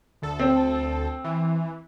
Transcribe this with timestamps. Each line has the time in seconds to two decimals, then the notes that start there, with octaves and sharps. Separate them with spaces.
0.22 D2 A4
0.39 C4
1.24 E3